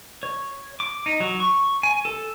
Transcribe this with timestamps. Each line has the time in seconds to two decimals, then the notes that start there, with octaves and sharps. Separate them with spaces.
0.23 C#5
0.80 D6
1.06 D#4
1.20 F#3
1.40 C#6
1.83 G#5
2.05 A4